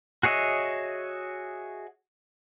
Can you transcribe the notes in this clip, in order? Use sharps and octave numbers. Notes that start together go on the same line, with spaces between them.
F#4 G#4 C#5 D#5 E5